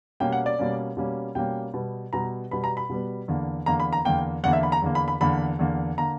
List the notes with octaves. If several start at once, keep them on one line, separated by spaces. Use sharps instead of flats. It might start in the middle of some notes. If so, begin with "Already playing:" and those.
B2 G3 A#3 C#4 G5
F#5
D5
B2 G3 A#3 C#4
B2 G3 A#3 C#4
B2 G3 A#3 C#4 G5
B2 G3 B3
B2 G3 B3 A#5
B2 G3 B3 B5
A#5
B5
B2 G3 B3
E2 D3 A#3
E2 D3 A#3 A#5
B5
A#5
E2 D3 A#3 G5
E2 D3 A#3 F#5
E5
B5
A#5
E2 D3 A#3
B5
B5
E2 D3 A#3 B5
E2 D3 A#3
D3 A#3 A#5